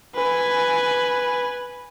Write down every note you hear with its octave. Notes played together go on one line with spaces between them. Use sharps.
B4 G#5